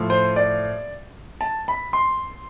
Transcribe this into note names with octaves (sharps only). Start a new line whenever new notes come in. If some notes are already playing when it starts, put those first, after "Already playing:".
Already playing: A2 F3
C5
D5
A5
B5
C6